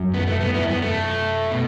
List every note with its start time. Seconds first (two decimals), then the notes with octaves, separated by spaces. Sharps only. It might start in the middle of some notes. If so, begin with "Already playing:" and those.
Already playing: F#2 F#3
0.14 B3
0.27 A3
0.41 B3
0.54 B3 E4
0.69 B3
0.82 A3
1.52 B2